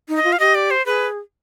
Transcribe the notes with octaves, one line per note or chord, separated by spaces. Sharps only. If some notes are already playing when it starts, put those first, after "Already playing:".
D#4
D#5
F4
F5
G4 D#5
D5
C5
G#4 B4